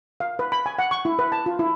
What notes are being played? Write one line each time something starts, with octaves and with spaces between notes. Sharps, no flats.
F5
B4
B5
G#5
F#5
C#6
E4
B4
A5
F4
E4